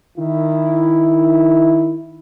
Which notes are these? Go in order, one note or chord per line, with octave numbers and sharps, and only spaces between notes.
D#3 E4